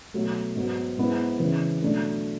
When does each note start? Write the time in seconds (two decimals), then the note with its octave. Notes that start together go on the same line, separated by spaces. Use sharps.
0.14 B2 F#3 A3
0.56 G#2 F#3 B3
0.98 G#2 G#3 B3 E4
1.40 C#3 E3 G#3
1.82 B2 F#3 A3 D4